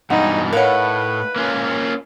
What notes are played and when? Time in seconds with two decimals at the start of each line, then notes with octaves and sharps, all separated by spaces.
0.10 G2 B2 E3 D#4 F#5
0.53 A2 A#4 B4 C#5 F5 F#5
1.36 A#3 C#4 F4